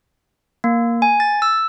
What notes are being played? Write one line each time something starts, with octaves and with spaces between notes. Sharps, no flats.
A#3
G#5
A6
E6